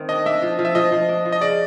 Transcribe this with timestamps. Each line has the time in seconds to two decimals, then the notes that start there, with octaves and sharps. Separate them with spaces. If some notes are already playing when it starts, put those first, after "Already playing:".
Already playing: D#3 A3 C4
0.09 D4 D#5
0.26 D4 E5
0.42 F3
0.59 F3
0.65 E5
0.75 F3 D#5
0.92 F3
1.08 D4
1.25 F3
1.32 D#5
1.41 C#3 D5